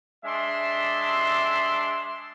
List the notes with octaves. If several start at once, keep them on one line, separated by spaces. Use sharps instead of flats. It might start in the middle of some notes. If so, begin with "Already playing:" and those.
G#3 D4 E5 C6